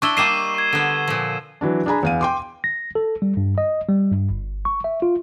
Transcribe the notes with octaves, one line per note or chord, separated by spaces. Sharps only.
D4 E4 C#6 E6 G7
G3 A#3 D#5 C7 D#7 E7
C#6 G#6
D3 B3
A#2 F3
E3 F#3 D4
D4 G#4 G#5 A#5 B5
E2 F5 D#7
G5 C6 D6
A#6
A4
G3
G2
D#5
G3
G2
G1
C#6
E5
F4